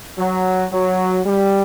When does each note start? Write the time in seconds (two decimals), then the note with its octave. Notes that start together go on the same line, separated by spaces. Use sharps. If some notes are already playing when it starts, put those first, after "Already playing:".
0.18 F#3
0.72 F#3
1.25 G3